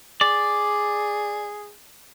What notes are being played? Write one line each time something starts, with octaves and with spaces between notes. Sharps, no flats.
G#4 D5